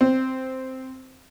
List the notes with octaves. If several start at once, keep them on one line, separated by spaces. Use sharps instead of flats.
C4